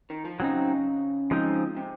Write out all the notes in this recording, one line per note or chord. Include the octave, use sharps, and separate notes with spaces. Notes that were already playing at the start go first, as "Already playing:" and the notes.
D#3
F3
C#3 F#3 C4 D#4
F3 G#3 C4 D#4
C3